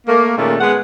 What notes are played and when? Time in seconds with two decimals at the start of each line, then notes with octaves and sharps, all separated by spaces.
0.07 A3 A#3
0.38 A#2 D#3 G#3 A3 C#4
0.60 G#3 B3 G#4 F#5